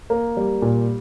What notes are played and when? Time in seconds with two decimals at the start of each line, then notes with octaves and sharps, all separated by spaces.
0.10 A#3
0.37 G3
0.62 A#2